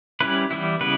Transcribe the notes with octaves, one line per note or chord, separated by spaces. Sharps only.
G3 C#4 E4 B4
E3 G3 B3 E4
C#3 G3 B3 E4 B4